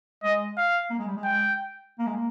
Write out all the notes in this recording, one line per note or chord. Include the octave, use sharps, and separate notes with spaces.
G#3 D#5
F5
A#3
G#3
G3
G#3
G5
A#3
G#3
A#3